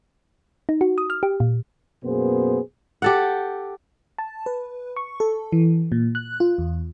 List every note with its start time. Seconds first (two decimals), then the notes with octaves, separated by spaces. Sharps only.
0.69 D#4
0.81 F#4
0.98 D#6
1.10 F6
1.23 G4
1.40 A#2
2.04 F#2 B2 A#3 B3 G#4 C5
3.02 G4 A4 F#5
4.19 A5
4.46 B4
4.96 C#6
5.20 A4
5.52 E3
5.92 A#2
6.15 F#6
6.40 F4
6.58 E2